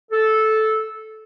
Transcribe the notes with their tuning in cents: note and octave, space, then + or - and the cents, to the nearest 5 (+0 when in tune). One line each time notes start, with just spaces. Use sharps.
A4 -10